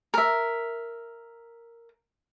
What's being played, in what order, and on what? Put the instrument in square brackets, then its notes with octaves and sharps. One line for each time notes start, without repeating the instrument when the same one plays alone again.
[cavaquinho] A#4 E5